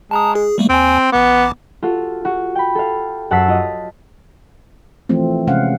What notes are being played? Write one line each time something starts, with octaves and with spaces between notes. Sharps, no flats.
G#3 A5 A#5 D#6
G#4
G3 A3 A#3
D#2 C4 G#5
A1 B3 D6
F4 F#4 A4
F#4
G5 B5
A4 F5
F#2 F#5 A5 E6 B6 C7
F4 D#5
E3 F3 A3 C4
C3 G#3 C#4 F5 F#5